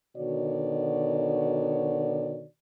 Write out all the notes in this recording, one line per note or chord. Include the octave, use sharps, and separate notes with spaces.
B2 D3 D#3 F#4 C#5 D5